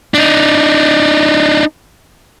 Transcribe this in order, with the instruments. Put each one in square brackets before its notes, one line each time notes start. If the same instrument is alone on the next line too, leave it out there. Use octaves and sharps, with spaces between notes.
[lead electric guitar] D4 D#4